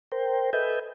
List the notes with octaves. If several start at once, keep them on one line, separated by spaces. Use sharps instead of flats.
A#4 C5 G5
A4 B4 D#5 E5 G#5 G6